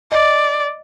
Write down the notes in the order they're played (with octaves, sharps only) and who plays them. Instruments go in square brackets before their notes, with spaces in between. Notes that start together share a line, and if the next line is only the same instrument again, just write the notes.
[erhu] D5 [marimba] D#5